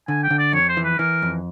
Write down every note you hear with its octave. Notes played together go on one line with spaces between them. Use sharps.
D3 G#5
G5
D3
D5
F2 C#5
C5
E3
B4
E3 A#4
F2